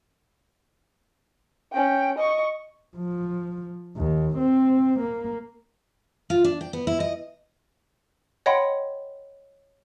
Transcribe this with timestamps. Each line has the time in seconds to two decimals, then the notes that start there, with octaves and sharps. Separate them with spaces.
1.73 C#4 G5
2.18 D#5 C#6
2.96 F3
3.97 D#2
4.38 C4
5.00 A#3
6.30 F4
6.44 D4
6.61 G5
6.73 B3
6.87 E4
7.00 D#5
8.46 C#5 D#5 F#5 G5 B5 C6